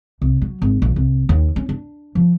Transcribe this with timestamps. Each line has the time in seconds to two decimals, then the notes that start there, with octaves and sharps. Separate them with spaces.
0.22 C2
0.41 F#3
0.62 G#1
0.82 A#1
0.96 C2
1.29 D#2
1.56 C#4
1.69 D4
2.15 F3